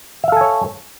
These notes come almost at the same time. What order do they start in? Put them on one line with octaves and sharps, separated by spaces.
E5 F5 A4 G#5 C#5